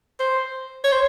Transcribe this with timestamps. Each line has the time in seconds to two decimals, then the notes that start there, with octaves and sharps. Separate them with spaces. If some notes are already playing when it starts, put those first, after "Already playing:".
0.20 C5
0.84 C#5
0.92 C5